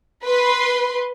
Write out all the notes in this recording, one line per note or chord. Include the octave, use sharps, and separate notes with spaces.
B4 C6